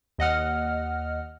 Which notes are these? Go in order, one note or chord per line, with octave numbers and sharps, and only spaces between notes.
D#2 D#5 F#5 F6